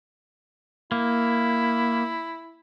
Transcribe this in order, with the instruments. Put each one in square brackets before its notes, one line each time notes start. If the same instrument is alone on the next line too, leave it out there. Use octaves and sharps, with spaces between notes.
[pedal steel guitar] A#3 [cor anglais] E4